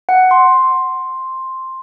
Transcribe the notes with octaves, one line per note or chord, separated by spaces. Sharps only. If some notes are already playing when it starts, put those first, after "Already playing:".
F#5
C6